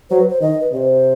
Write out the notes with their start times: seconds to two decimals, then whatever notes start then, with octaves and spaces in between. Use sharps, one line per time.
0.10 F#3 C5
0.19 B4
0.29 C5
0.41 D#3 D#5
0.61 B4
0.72 C3 D#5
0.77 C5